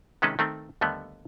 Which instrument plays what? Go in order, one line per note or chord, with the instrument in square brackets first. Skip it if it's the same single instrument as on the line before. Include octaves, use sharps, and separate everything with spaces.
[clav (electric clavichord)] C3 D#3 G#3 C#4 A4 B4
D#3 A3 C4
D#2 D3 G3 A3 B3